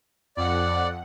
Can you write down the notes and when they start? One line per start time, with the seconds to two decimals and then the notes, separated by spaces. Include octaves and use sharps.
0.37 F2 D5 F#5